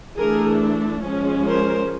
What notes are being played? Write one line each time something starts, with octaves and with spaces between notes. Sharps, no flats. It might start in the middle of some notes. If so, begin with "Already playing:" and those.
E3 A3 D4 G#4 A#4
F3 G#3 C#4
A#4 C5